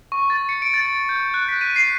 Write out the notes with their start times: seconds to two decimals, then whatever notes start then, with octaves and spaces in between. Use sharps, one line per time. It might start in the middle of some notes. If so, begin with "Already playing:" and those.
0.12 C#6
0.30 A6
0.49 C#7
0.62 D7
0.74 A6
0.85 D7
1.09 G6
1.34 F#6
1.49 B6
1.61 D#7
1.76 C7